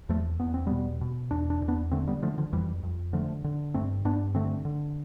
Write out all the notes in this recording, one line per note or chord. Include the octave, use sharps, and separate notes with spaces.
E2 F3 A3
E2 B3
C4
B2 G3 B3
B2
E2 D4
D4
E2
B3 D4
D3 A3 C4
G3 B3
D3 F3 A3
D3 F3
F2 E3 G3
F2
D3 F3 A3
D3
G2 A3 C4
G2 B3 D4
D3 A3 C4
D3